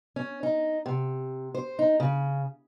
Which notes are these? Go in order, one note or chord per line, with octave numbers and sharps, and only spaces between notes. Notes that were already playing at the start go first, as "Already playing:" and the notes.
C#4
D#4
C3
C5
D#4
C#3